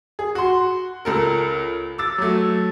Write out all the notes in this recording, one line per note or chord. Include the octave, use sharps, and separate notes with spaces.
G#4
F#4 C6
C#2 A4 A#4
D6 E6 A6
F#3 A3